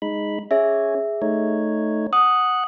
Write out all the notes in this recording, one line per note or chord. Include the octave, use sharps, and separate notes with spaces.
G#3 D#4 B5
C#4 G#4 C#5 E5
A3 D#4 C#5
F#5 D#6 F#6